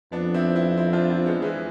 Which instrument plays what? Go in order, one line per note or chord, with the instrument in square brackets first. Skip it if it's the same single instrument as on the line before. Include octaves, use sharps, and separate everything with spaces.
[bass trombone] F2 [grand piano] B3 D4
[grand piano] C4 E4
C4 E4
C4 E4
D4 F4
C4 E4
G#3 B3
E3 G#3